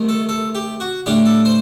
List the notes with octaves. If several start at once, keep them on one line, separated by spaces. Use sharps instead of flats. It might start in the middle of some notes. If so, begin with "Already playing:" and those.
Already playing: C2 C3 D#3 A3
A4
A4
G4
F#4
A2 G3 D4 G4
A4
C5